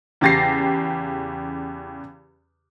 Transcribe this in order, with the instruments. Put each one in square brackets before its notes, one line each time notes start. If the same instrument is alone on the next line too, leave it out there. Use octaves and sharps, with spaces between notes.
[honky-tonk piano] E2 C#3 G4 A6 A#6 C7